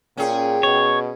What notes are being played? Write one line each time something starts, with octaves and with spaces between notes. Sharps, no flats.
A#2 C#4 G#4 G5
B2 C#5